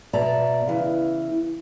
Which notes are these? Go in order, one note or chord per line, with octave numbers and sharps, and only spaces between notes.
B2 D5 E5 A5 A#5
C#3 E3